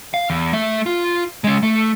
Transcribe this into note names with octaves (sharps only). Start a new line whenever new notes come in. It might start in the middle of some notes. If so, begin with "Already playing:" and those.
F5
E2
A3 E5
F4
G#3 C#4
A3